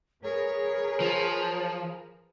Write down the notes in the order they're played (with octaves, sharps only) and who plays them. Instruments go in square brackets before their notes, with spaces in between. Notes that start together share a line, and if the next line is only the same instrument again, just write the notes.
[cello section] G#4 A#4 B4 [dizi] C#5
[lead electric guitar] F3